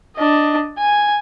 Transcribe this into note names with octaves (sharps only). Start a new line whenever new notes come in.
D4 D#5
G#5